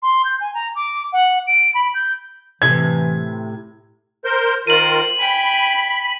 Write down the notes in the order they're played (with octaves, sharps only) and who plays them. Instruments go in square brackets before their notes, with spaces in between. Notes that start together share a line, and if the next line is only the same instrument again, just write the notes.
[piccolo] C6
G6
G#5
A#5
D6
F#5
D7
B5
G6
[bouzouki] A2 C3 [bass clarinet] E3 [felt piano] G#6
[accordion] A#4 C5 G6
[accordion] D#3 F4 A#4 [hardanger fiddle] C5 [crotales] D#7 F#7
[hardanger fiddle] G5 G#5 [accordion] B5